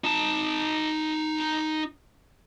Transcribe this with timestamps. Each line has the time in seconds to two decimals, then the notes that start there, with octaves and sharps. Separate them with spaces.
0.04 D#4 A5